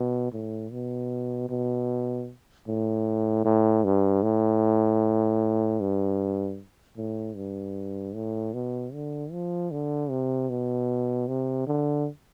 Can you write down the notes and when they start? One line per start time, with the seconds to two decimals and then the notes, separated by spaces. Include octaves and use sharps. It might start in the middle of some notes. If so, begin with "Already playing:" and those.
Already playing: B2
0.32 A2
0.72 B2
1.49 B2
2.68 A2
3.45 A2
3.84 G2
4.23 A2
5.81 G2
6.97 A2
7.36 G2
8.14 A2
8.54 B2
8.93 D3
9.32 F3
9.71 D3
10.10 C3
10.50 B2
11.28 C3
11.67 D3